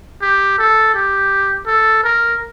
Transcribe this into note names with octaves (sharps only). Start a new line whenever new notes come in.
G4
A4
G4
A4
A#4